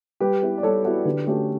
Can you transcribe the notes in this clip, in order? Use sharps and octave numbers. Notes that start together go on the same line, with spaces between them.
G3 G4 B4
B3 E4
D5
G3 A4 C#5
B3 E4 F#4 A4
D3 G4 B4
A3 C#4 F#4 G4 A4